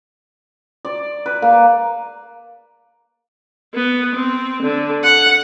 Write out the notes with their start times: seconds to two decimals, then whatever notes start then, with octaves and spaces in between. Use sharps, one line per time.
0.85 D5
1.26 B4
1.42 A#3
3.74 B3
4.15 C4
4.63 D3
5.04 F#5